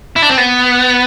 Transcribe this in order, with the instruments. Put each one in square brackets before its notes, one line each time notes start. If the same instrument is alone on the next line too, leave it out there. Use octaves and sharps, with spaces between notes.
[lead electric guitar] E4
D4
C4
B3